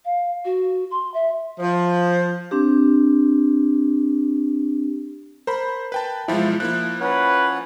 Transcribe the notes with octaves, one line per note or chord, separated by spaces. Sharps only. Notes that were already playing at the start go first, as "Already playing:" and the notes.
F5
F#4
C6
E5
F3
C4 D4 G4
A#4 C5 B5
B4 G5 A5
B1 F3 G#3 E4 F4
F3 A#3 E4 F#6
C#4 B4 C#5 F#5